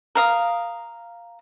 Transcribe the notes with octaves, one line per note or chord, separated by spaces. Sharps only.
A#4 F5 D#6